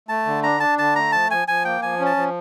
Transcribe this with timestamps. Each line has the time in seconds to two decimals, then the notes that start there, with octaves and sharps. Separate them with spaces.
0.08 A3 A5
0.26 D3
0.43 D4 A#5
0.60 D4 A5
0.78 D3 A5
0.95 A3 A#5
1.12 F3 A5
1.30 F3 G#5
1.47 F3 G#5
1.65 A#3 G5
1.82 F3 G#5
2.00 C#4
2.06 A5
2.17 F3